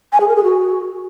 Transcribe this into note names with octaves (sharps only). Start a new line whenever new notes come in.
G#5
G#4
A#4
G#4
F#4